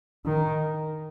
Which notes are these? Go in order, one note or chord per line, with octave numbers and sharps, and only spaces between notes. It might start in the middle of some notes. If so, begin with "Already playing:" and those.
D#3